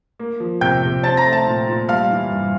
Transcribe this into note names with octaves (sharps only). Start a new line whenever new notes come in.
A#3
F3
C3 G5 G6
C3
C4 A5 A6
A#5 A#6
A3
A5 A6
A#2
A#2
G3 F5 F6
E3
G2